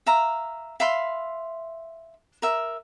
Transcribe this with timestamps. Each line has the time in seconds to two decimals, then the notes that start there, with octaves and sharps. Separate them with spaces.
0.06 E5 F5 A#5
0.80 E5 F5 B5 C6
2.42 A#4 E5